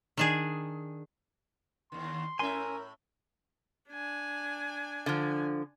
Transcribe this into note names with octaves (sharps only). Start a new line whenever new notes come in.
D#3 D4 G#4
D#2 D#3 C6
A2 C#4 A#4 E5 G#5 C6
D4 G#5
D3 F3